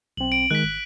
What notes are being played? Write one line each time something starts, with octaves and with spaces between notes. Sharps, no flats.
B1 C4 F#7
D7
D#3 G#3 F#6 B6
G#1